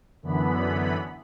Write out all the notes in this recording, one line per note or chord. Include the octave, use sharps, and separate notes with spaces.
F#2 D3 E3 B3 B5